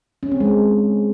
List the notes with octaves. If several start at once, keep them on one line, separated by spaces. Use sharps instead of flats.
C#4
C4
G#3